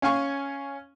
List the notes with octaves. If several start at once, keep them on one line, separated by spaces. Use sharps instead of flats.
C#4 F5 G#5 C#6